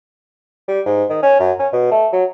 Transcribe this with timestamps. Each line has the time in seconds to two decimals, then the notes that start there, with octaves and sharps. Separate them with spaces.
0.68 G3
0.86 G#2
1.10 D#3
1.22 C#4
1.40 F#2
1.59 C#4
1.73 B2
1.91 A3
2.12 F#3